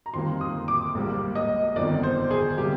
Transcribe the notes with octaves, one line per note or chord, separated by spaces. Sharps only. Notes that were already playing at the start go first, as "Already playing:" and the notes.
A#5
F2 D#3 G3 A#3 C6
D#6
D6
A#1 G#2 G3 A#3
D#5
G1 F2 D#3 D5
C5
G#4
C3 G3 A#3 G4